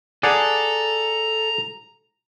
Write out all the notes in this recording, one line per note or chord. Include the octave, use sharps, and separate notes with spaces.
G#4 A4 D5 F#5 A#5